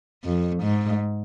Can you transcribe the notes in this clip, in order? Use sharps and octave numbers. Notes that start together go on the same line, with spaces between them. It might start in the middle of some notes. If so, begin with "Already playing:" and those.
F2
G#2